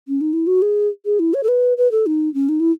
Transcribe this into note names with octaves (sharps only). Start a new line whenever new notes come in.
C#4
D#4
E4
F#4
G#4
G#4
E4
C#5
A4
B4
B4
A4
D#4
C#4
D#4
E4